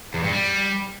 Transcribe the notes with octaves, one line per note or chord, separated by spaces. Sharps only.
E2
G2
G3